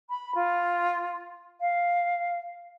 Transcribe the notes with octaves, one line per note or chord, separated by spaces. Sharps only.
B5
F4
F5